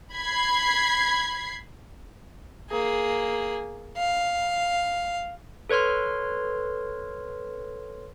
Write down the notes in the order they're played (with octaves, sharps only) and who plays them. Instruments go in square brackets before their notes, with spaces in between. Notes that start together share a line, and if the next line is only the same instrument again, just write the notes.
[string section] B5 G#6 C7
[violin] A#3 G#4
F5
[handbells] A4 B4 C#5 C6 F6